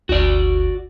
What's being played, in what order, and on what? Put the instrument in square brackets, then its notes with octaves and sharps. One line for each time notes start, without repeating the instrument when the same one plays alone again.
[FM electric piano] G1 D2 [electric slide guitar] F#4 D5